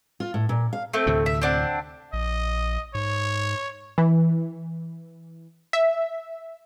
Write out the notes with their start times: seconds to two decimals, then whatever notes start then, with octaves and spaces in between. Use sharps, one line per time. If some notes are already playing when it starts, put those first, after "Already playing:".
0.20 F4
0.34 A2
0.49 A#2
0.73 F5
0.93 A3 C4
1.06 D2 A2 C3
1.26 E5
1.42 C4 D4 F#5
2.13 A#1 D#5
2.95 G#2 C#5
3.98 E3
5.73 E5